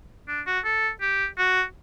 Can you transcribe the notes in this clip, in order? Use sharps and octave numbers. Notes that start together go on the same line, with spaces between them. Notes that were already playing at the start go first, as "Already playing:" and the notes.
D4
F#4
A4
G4
F#4